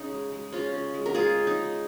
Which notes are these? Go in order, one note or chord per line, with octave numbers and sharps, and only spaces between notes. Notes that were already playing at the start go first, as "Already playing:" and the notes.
Already playing: C#3 C#4 D#4
G#3
G#3
C#3 C#4 F4
C#3
G#3
A#4
G#3 F4 G#4
C#3
D#4
C#3